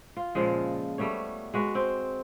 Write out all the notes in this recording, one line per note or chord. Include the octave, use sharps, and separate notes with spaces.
F4
A#2 C#3 F3 G#3
G3 A3 B3 C#5
G#3 F#4 B4 F#5
C4